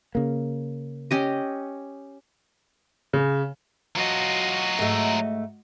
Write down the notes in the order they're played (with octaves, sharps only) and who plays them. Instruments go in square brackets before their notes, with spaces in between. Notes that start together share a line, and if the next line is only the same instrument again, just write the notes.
[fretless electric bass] C#3 A#3
[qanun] C#4 G4 D#5
[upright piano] C#3
[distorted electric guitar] F#3 F4 [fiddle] F#4 D#5
[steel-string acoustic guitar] G#2 A3